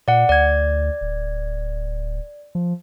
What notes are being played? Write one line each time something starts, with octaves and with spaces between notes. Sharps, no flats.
A#2 D5 F#5
D2 D5 G#6
D1
F3